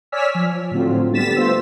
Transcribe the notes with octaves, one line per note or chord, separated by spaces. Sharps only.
C#5 D5 G#5 E6 F6 B6
F3
A2 D3 F3 F#3 C4 F4
D3 G3 B3 A6 B6 E7
A3 B3 F4 C5 E6